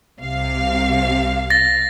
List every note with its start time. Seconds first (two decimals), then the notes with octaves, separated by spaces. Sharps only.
0.19 C2 C3 F5
1.50 A6 A#6